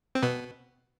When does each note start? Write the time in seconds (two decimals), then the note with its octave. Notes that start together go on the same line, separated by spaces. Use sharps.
0.15 C4
0.23 B2 B3